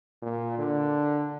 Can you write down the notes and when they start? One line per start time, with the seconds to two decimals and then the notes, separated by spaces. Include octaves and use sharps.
0.22 A#2
0.58 D3